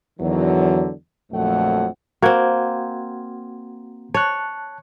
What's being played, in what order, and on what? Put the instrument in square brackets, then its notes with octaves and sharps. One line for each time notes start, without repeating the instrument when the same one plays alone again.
[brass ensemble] E2 D3 D#3 F#3
A#1 F2 F#3 A3 F#5
[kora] A#3 C4 [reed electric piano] F#4 F#5 G#6
[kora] C#5 [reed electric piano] A5 F#6